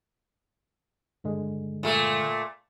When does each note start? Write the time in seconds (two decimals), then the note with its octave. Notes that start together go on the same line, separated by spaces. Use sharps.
1.24 G2 D3 G#3
1.83 A#2 A3